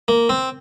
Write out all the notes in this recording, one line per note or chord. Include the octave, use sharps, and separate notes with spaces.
A#3
C4